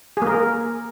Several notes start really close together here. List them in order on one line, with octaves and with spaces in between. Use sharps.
G#4 A#3 A#4